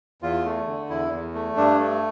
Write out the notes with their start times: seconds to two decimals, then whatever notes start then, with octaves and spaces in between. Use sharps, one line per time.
0.22 E2 F4
0.45 A3
0.67 D3
0.89 E2 E4
1.12 E2
1.34 A3
1.57 G2 D4
1.80 A3